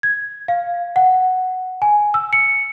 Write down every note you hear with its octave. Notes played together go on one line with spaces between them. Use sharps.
G#6
F5
F#5
G#5
E6
C#7